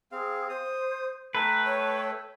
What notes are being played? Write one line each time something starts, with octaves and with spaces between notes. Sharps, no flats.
C4 G#4 F5
C5 D#6
A3 A4 B4 G5 A#5
C#5